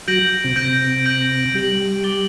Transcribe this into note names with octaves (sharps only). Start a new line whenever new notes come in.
F#3 F#4 G6 A#6 D7 F#7
C3 C4
C3 C4 G6 A#6 D7 F#7
G6 A#6 D7 F#7
G3 G4 G6 A#6 D7 F#7
D6 A6 D7 G7